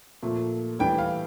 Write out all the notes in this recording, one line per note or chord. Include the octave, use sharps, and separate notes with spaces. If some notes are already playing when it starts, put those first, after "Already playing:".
A#2 F3 A3
A2 E3 G3 G5
F5